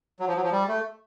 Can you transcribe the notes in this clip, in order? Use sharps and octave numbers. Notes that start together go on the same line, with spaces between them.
F#3
F3
F#3
F3
G3
A3